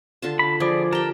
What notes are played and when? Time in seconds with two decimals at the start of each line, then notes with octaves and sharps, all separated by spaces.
0.22 D3 F4 A5
0.39 B5
0.60 F3 G#4 D5
0.92 G4 A#4 G5 A5